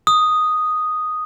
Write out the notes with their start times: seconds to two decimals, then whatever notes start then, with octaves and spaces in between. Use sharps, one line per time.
0.07 D#6